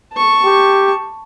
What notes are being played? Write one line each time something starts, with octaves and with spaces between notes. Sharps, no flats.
A5 C#6
G4